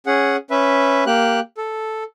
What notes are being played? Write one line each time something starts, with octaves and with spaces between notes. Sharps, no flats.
C#4 G#4 F#5
C#4 B4 E5
A#3 G4 F#6
A4